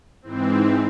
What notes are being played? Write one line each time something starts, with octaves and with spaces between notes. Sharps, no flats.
G#2 E3 C4